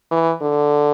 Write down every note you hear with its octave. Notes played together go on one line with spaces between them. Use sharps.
E3
D3